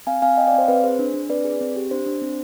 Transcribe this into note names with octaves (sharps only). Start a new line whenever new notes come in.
C4 F5 G#5
C4 F5 G#5
C4 D#5 G5
D5 F5
C4
C5
C4 B4
G#4 C5
D4
D4
C4 B4 D5
G#4
C4
G4
D4 C5
D4
C4